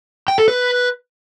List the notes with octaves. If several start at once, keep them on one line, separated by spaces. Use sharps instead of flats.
G5
A4
B4